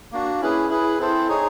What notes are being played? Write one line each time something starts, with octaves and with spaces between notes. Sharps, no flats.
A#3 D4 F#4
C#4 E4 G#4 B4
E4 G#4 B4
C4 E4 A4 C5
D#4 G#4 C#5